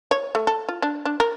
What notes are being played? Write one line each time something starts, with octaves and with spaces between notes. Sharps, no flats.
C#5
A3
A4
F4
D4
D4
A#4